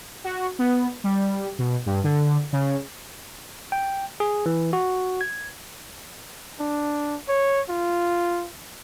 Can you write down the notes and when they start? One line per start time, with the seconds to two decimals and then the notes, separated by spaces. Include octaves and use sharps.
0.24 F#4
0.59 B3
1.04 G3
1.59 B2
1.86 G2
2.04 D3
2.53 C#3
3.72 G5
4.20 G#4
4.46 E3
4.73 F#4
5.21 G#6
6.60 D4
7.29 C#5
7.69 F4